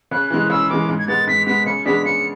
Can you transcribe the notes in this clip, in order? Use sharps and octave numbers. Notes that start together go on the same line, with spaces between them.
C#3 F#6
E3 G#3 F#6
C#3 E6
E3 G#3 D6
G#2
G#6
G#3 B3 A6
G#2 B6
G#3 B3 B6
C#3 C#7
G#3 B3 D4 G#4 B6
C#3 C#7